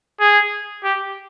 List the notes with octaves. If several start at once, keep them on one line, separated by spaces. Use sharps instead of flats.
G#4
G4